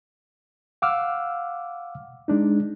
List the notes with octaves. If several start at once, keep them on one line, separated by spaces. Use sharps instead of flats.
F5 F#5 D6 E6 F6
G#3 D4 D#4